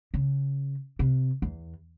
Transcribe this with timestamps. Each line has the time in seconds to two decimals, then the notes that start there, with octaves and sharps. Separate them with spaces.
0.14 C#3
0.99 C3
1.42 E2